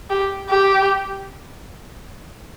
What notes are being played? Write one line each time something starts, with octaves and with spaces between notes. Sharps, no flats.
G4
G4